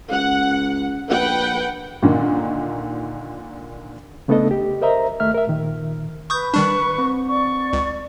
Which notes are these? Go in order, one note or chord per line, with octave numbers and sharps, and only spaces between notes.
C#2 F#5
A#1 B4 F#5 G5
A#2 D3 D#3
C#3 A3 B3 D4 A4 D#5
G4
A#4 C5 D#5 E5 A#5
D#2 A3 E5 F6
A#4 E5
A#2 D#3
B4 C#6 D#6 G6
D#3 G3 D4 C#6
C4
D5 C#6
C#2